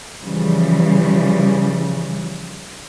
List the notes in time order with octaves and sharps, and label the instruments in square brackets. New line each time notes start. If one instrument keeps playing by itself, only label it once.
[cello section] C#3 E3 F3 G3